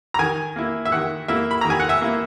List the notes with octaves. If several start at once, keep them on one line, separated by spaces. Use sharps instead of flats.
A#5
D#3 G#5
A#3 E4
E5
D#3 F#5
A#3 E4 E5
B5
D#3 A#5
G#5
F#5
E5
A#3 E4